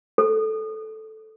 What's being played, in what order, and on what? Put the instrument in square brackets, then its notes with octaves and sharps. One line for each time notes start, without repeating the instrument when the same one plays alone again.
[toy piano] A4